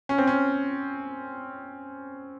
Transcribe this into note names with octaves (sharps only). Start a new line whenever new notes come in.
C#4
C4
C#4